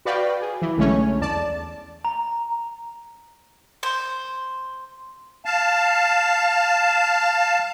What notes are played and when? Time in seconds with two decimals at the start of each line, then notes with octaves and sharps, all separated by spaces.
0.05 F#4 B4 D5 F5 G5
0.42 G#4
0.62 E3
0.77 B1 D3 G#3 A3 C#4 C#5
1.21 E2 D5 A5
2.05 A#5
3.83 C5
5.45 F5 A5